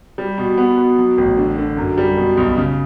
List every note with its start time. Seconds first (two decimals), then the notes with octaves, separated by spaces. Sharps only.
0.18 G3
0.38 B2
0.58 B3
0.78 B2
0.98 F#3
1.18 A1
1.37 D3
1.58 D3
1.77 F#2
1.98 G3
2.17 B2
2.37 B1
2.57 C#3